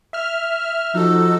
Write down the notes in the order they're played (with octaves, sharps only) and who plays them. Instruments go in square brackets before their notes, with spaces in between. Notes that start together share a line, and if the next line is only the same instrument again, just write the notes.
[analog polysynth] E5 F6
[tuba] F3 [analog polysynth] D#4 A4 [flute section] F#4 E6